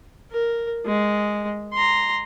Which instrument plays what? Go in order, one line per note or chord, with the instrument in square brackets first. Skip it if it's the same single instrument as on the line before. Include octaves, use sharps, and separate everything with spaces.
[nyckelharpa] A#4
G#3
A#5 C6